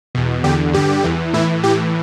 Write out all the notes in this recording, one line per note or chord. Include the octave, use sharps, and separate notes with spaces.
E2 B2
E2 D3 G4
G2 D3 G4
E2 E3
A2 E3 E4
A2 E3 G4